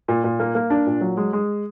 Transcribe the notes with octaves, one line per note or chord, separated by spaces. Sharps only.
A#2
A#2
A#3
A#3
D4
A#2
F#3
G#3
G#3